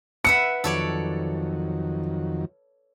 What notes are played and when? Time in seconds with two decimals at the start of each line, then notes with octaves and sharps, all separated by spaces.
0.25 B4 E5 F#5 C#7
0.64 F2 D#3 F#3 A4 C#5 D5